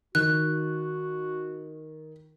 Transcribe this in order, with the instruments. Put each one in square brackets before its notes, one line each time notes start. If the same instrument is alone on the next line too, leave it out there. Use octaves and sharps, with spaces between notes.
[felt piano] D#3 [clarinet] F#4 [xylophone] F#6